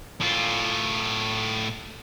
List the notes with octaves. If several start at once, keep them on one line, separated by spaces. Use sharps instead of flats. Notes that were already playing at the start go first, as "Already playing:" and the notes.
A2 F4